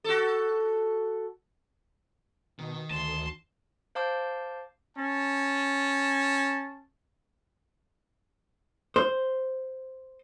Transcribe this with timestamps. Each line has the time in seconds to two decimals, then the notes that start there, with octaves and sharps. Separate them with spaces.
0.04 F#4 A4
2.59 B2 D#3
2.90 D2 A5 C6
3.95 C5 F5 A5 D6 G6
4.98 C#4 A5
8.96 C5